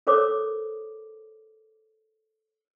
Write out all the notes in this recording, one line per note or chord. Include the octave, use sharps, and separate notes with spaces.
A4 A#4 C5 C#5 D6 D#6